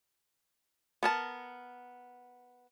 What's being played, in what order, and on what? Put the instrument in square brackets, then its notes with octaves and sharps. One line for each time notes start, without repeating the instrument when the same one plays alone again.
[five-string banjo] B3 A#4 A5